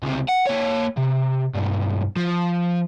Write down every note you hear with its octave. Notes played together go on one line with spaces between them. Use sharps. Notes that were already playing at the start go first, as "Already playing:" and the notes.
C#2 C3
F#5
A#3 C#5
C3
B1 G2
F3